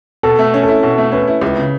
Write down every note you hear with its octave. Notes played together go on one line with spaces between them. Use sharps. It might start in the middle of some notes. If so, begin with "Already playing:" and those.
B2 A4
A3
C#4
E4 A4
B2
A3
C#4 B4
E4
C#2 B4
C#3